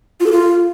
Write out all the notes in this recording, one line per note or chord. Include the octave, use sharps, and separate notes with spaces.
F4
A4
F4